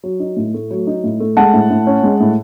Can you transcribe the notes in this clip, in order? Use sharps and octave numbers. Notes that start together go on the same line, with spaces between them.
F#3
D#4
A2
A3
F#3
D#4
A2
A3
G#3 F#5 A5
A2
A2
C#4
G#3
A2